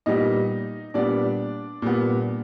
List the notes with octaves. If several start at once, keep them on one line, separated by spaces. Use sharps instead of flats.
A#2 G3 B3 D#4 D#5
A#2 G3 B3 D4 D5
A#2 G3 B3